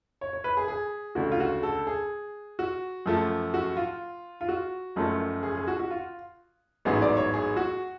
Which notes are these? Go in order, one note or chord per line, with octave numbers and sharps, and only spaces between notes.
C#5
C#5
B4
G#4
G#4
D2 C#3 G#3 F#4
F4
F#4
A4
G#4
F#4
F#2 F3 A3
F#4
F4
F4
F#4
F#1 F#2 F3 A3
G#4
G#4
F#4
F#4
F4
A1 G#2 F#3 B3 G#4
D5
C#5
G#4
F#4